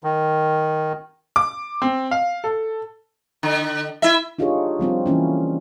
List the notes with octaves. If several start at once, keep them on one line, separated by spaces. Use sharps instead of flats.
D#3
D6
C4
F5
A4
D3
E4 E5
D4 D#4 F4 G4 G#4 C#5
F3 G3 C4 F4
E3 A#3 C#4 E4